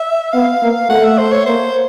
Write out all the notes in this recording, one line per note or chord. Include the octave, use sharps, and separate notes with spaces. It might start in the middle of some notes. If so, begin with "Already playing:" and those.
Already playing: E5
B3 F5
A#3
A3 F#5
E5
C5
C#5
A#3 C5